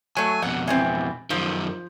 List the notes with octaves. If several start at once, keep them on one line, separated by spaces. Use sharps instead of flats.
F#3 A3 G#5
F2 B2 F#5
E3 B3 C4
F#2 D#3 F3